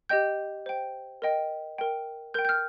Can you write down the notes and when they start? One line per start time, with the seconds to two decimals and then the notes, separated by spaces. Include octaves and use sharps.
0.09 G4 D#5 G5 G6
0.66 C5 G5
1.22 A#4 D#5 G5
1.78 A#4 G5
2.34 A#4 G5 G6
2.45 G6
2.49 F6